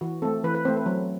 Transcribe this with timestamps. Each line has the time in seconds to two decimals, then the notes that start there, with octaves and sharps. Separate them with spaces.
0.01 E3 F#4
0.22 A3 C4 A4
0.44 E3 B4
0.55 B4
0.65 C4 C5
0.68 A3
0.76 B4
0.86 F#3